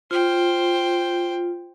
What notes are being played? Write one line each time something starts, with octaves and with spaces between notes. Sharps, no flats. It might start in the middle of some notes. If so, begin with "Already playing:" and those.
F4 C5 G5